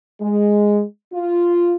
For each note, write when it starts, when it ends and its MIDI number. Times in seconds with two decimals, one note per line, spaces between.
0.21 0.83 56
1.13 1.76 65